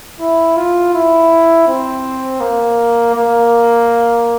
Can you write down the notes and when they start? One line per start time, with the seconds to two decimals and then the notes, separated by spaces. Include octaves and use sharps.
0.20 E4
0.57 F4
0.94 E4
1.68 C4
2.41 A#3
3.15 A#3